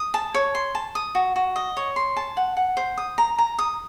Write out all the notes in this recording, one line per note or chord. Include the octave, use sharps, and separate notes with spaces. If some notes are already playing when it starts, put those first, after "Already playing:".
Already playing: D#6
A5
C#5
C6
A5
D#6
F#4
F#4
D#5
C#5
C6
A5
F#5
F#5
C5
D#6
A#5
A#5
D#6